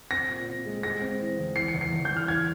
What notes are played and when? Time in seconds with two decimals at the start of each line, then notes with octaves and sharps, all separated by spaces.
0.11 C4 A#6
0.29 A#2
0.47 C4
0.66 G#3
0.83 G#3 A#6
1.02 C4
1.20 E3
1.39 E2
1.56 E3 C7
1.68 C#7
1.74 E2
1.81 C7
1.92 E2
2.05 G6
2.11 E2
2.17 F6
2.28 E3 G#6